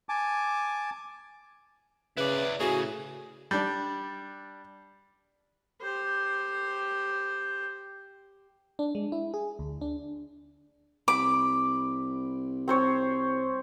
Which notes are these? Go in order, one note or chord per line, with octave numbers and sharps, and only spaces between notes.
G#5 A5 D6
C#3 E4 B4 D5
A2 C#3 F#4 G#4
G3 D4
G4 C5
D4
G#3
E4
G#4
D2
D4
C2 B5 D6
C4 C5 C#5